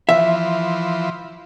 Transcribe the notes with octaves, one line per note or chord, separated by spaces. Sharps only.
E3 F3 E5